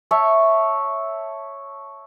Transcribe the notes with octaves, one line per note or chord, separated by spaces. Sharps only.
C#5 E5 A5